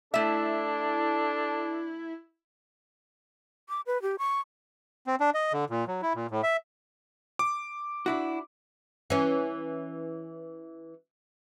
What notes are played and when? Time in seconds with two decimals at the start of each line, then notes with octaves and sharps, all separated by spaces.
0.14 A3 D4 E4 A4 E5
3.69 D6
3.87 B4
4.02 G4
4.19 C#6
5.07 C4
5.20 D4
5.34 D#5
5.53 D3
5.70 A#2
5.87 F#3
6.02 E4
6.15 A#2
6.31 A2
6.43 E5
7.39 D6
8.06 D4 E4 F#4
9.10 E3 C#4